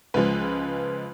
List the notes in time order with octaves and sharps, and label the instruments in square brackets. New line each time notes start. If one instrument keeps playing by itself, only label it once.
[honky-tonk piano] C#2 C#3 F3 G#3 B4